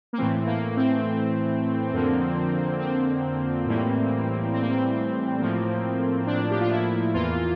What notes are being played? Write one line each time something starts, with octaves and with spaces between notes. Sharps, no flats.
A#3
A2 E3 A3 C4
A#3
C4
F2 D3 F3 A#3
C4
A2 E3 G3 A#3
C4
A#3
C4
A2 F3 A#3
D4
G4
F4
E4
E2 E3 A#3 F4